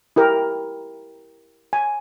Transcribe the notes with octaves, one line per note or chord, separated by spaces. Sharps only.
E4 G4 A#4
G#5